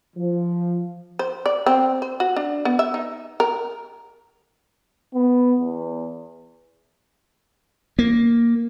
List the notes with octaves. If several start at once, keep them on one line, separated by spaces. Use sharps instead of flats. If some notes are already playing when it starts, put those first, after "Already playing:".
F3
C5
D5
C4
C5
F#4
D4
B3
E5
D#4
A#4
B3
E2
A#3